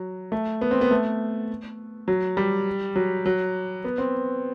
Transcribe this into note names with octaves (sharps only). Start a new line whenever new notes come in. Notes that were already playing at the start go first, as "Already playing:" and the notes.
Already playing: F#3
A3
B3
C4
B3
A3
F#3
G3
F#3
F#3
B3
C4